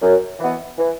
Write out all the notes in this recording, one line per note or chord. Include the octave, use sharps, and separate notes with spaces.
F#2
E3 B3
E3